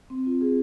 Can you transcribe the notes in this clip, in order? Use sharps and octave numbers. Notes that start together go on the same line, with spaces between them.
C4
F4
G#4